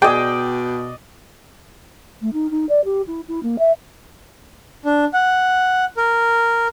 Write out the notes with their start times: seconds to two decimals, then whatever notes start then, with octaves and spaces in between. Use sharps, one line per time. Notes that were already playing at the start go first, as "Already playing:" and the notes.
0.02 B2 G#4 D5 D#5 G5
2.22 A3
2.33 D#4
2.50 D#4
2.69 D5
2.84 G4
3.07 E4
3.28 E4
3.43 A#3
3.59 E5
4.85 D4
5.14 F#5
5.97 A#4